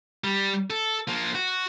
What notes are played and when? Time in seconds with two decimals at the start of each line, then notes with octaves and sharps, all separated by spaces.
0.24 G3
0.70 A4
1.08 F3 A#3
1.35 F#4